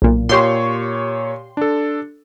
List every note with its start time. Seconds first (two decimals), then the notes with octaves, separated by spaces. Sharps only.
0.02 B1 A#2
0.29 A#2 G4 C#5 C6 C#6
1.57 D4 A4